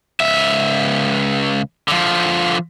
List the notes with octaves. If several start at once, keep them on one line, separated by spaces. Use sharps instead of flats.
C#2 E5
D3 F3